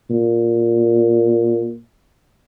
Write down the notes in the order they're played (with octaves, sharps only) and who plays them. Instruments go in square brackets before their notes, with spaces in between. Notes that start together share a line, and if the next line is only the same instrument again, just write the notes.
[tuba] A#2